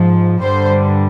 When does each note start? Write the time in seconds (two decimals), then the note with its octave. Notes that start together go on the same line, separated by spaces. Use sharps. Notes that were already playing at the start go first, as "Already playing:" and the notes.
Already playing: G#2 F3
0.42 G2 D3 G3 C5